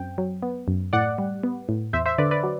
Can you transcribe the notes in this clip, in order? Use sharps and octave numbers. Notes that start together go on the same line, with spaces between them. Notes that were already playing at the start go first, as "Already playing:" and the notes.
Already playing: F#2 C4 G5
F#3
B3
F#2
A2 D5 F#5
G3
B3
A2
E2 C5 E5
C5 E5
D3 B4 D5
B4 D5
F#3